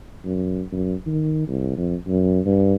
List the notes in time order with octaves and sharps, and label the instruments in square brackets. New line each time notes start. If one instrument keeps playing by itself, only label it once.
[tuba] F#2
F#2
D#3
C2
F2
F#2
G2